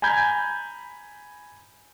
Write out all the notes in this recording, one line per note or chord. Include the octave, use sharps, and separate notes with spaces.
G#5 A#5 B5 G6 G#6